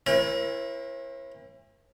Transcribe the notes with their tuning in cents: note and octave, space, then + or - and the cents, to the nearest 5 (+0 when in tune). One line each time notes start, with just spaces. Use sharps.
C#4 -45 E4 +25 A#4 +40